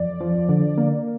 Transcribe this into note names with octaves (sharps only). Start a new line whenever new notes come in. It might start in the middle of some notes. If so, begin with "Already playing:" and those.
Already playing: F2 D5
F3
D3
A#3